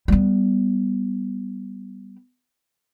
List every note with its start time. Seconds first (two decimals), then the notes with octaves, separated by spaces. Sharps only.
0.08 G3 B3